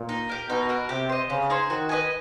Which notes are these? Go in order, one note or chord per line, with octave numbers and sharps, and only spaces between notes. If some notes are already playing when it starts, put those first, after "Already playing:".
Already playing: A#2
D#4
G4 A#4
B2 D#4
F#4 A#4
C3 G4
C5 D#5
C#3 B3
D#4 G#4 C5
D#3 F#4
B4 D#5 G#5